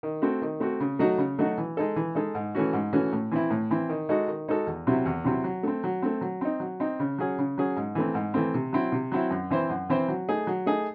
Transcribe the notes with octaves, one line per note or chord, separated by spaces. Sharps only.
D#3
A3 C4 F#4
D#3
A3 C4 F#4
C#3
F#3 A3 D#4 F#4
C#3
F#3 A3 D#4 F#4
E3
G#3 D#4 A4
E3
G#3 D#4 A4
G#2
E3 A3 C#4 F#4
G#2
E3 A3 C#4 F#4
A2
E3 C4 E4
A2
E3 C4 E4
D#3
G#3 D#4 F#4 A4
D#3
G#3 D#4 F#4 A4
E2
C3 F#3 C4 E4
E2
C3 F#3 C4 E4
F#3
A3 C4
F#3
A3 C4
F#3
C4 D#4
F#3
C4 D#4
C#3
F#3 C#4 G#4
C#3
F#3 C#4 G#4
G#2
E3 A3 C4
G#2
E3 A3 C4
C3
F#3 C4 E4
C3
F#3 C4 E4
F#2
E3 C4 E4 C5
F#2
E3 C4 E4 C5
F#3
A3 D#4 G#4
F#3
A3 D#4 G#4